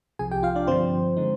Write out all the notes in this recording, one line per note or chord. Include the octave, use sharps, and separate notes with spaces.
C2 C3 F3 G#4 G#5
G4 G5
F4 F5
D4 D5
G2 D3 F3 C4 C5
D3 G#3 D#4